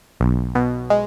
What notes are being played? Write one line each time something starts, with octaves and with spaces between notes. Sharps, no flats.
B1
B2
G#3